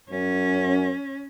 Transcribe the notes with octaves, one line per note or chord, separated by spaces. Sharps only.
F#2 C#4